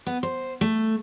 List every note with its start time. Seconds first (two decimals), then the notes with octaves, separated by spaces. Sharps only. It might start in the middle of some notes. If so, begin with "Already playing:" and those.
0.07 B3
0.23 C5
0.61 A3